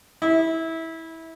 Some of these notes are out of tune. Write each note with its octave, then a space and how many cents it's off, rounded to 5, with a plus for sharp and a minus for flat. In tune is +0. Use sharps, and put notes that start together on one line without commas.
E4 -20